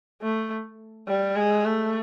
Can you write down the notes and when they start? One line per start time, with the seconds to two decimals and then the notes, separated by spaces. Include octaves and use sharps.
0.22 A3
1.08 G3
1.36 G#3
1.65 A3